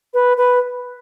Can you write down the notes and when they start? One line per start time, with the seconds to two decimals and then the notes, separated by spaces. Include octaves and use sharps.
0.14 B4
0.37 B4